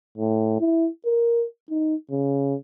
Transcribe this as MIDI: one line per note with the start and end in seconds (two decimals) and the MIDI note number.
0.18 0.56 45
0.60 0.89 64
1.06 1.44 70
1.70 1.95 63
2.11 2.55 49